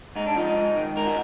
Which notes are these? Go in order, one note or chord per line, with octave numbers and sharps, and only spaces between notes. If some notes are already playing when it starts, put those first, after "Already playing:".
G#2 D#4
D4
F3 D#4
G#2
D#3
G#2 A#4
F#4